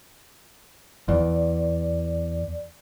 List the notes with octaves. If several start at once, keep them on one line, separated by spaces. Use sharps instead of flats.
E2 D5